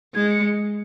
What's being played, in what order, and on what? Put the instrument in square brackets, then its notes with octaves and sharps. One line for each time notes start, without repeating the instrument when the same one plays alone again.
[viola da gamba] G#3 [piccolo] G#6
[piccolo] C#7